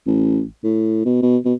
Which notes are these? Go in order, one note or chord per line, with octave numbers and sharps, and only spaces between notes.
A1
A2
B2
B2
B2